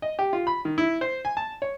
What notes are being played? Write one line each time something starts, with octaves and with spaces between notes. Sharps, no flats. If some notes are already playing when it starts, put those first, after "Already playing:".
D#5
G4
F4
B5
D#3
E4
C5
G#5
A5
C#5